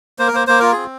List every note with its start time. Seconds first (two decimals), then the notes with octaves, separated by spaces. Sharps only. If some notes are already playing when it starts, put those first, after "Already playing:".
0.19 A#3 C5
0.27 A#4
0.33 A#3 C5
0.47 A#3 C5
0.60 F4 A#4
0.72 C4 G#4